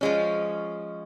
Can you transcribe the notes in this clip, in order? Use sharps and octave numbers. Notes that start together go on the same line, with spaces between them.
F3 G#3 C#4